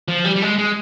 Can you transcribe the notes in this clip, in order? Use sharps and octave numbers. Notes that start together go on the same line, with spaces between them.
F3
G3
G3
G#3
G#3